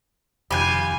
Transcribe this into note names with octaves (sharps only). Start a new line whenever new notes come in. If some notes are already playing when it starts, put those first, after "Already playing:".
F1 D#3 F4 G4 G#5 B5 G6